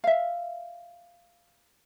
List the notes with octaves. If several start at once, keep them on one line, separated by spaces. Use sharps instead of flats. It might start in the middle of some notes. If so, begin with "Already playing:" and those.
E5 F5